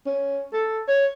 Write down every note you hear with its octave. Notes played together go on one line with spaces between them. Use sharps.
C#4
A4
C#5